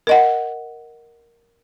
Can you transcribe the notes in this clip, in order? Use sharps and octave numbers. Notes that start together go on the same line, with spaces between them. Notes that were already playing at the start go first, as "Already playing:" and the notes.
A#4 D#5 F#5